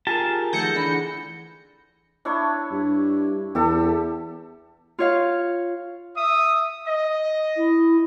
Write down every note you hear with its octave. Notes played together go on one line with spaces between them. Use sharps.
F4 G4 G#4 A#4 A5
D#3 F3 A3 G#4 F#5 G6 A#6 C#7
D3 E3 D4 B5
D4 E4 C#5
G2
E2 G4 A4
F4 C#5 F5
E5 D#6
D#5
E4